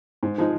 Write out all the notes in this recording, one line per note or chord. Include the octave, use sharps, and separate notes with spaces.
G#2
F3 G#3 D#4